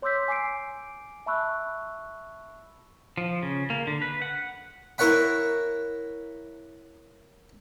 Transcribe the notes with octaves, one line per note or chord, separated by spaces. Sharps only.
C#5 C6 D6 E6 G6 B6
G#5 D6 C7 D7
E5 A5 B5 C#6 E6 F#6
F3
C#3
A#3
D3
B4
F#5
E4 A#4 C#5 F#5 B5